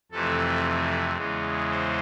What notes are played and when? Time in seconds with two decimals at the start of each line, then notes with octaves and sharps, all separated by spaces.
0.11 F2 C3 E3 A3 A4
1.16 E2 C#3 E3 G#3
1.69 C5